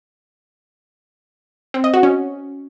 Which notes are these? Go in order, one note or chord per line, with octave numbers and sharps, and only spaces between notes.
C4
D#5
F#4
C#4